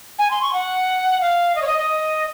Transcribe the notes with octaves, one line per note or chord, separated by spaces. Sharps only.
G#5
C6
C#6
F#5
F5
D#5
C#5
D#5
D#5